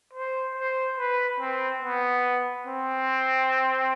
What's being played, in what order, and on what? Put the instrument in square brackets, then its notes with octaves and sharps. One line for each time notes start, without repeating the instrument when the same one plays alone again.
[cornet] C5
C5
B4
C4
B3
C4